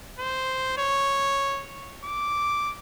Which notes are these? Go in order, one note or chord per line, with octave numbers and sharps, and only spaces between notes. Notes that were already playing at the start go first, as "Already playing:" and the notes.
C5
C#5
D6